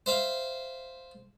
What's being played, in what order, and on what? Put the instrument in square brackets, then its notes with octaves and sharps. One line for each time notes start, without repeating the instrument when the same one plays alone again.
[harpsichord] C5 E5 F5